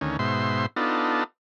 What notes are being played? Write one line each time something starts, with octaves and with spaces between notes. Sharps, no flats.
D2 D#3 C#4
G#2 B2 C5 E5 C6
B3 D4 D#4 F4 A4